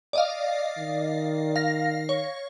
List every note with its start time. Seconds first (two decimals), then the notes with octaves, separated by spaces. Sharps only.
0.13 D5 D#5 F5
0.78 D#3
1.56 F5 A#6
2.09 C#5